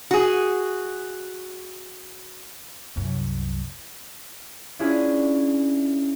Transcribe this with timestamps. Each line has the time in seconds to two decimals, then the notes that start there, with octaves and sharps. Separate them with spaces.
0.11 F#4 G#4
2.96 C2 F#2
4.79 C#4 D4 E4 F4 G#4